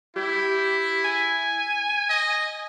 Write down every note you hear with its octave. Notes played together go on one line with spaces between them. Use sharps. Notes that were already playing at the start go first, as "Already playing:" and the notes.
E4 G4
G#5
D#5